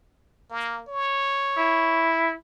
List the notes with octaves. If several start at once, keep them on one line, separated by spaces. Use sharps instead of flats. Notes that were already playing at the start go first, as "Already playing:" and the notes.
A#3
C#5
E4